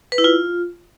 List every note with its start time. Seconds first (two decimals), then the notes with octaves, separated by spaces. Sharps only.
0.12 B4
0.18 E4
0.24 F4